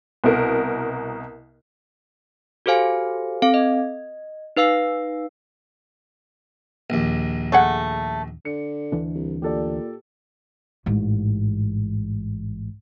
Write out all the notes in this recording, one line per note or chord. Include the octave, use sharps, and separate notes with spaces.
C2 B2 A#4
F#4 G4 A4 C5 F5 G#5
C4 A4 F5
D#5
D#4 B4 F5 E6 C7
A#1 D#2
A3 G#4 F#5
D3 C#7
D2 E3 D4
C2
A#2 G4 A4 D5
A1 G#2